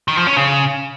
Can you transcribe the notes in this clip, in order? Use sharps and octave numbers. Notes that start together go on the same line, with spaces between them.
D#3
F3
C#4
C#3